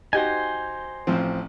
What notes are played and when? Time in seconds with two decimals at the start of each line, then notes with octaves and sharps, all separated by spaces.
0.13 D#4 F#4 G4 C5 G5 G#5
1.07 A1 F3 C4